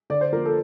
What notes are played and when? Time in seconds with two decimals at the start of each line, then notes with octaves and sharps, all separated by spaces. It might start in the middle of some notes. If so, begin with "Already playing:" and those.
0.10 D3 D5
0.21 C5
0.32 F3 A#3 A#4
0.46 A4